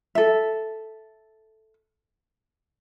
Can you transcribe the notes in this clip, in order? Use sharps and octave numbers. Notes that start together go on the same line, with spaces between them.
A4 E5